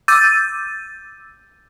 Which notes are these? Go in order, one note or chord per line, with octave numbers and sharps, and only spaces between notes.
D6 E6 G6 A6 D#7